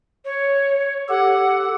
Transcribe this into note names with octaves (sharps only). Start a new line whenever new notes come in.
C#5
G4 A4 F#5